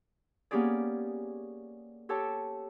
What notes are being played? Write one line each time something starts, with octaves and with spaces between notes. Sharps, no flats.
A#3 B3 C#4 G4 G#4 D5
G4 A4 C#5 G5 A5